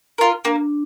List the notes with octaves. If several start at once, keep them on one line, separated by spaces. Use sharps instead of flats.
F4 A#4
A#3 D4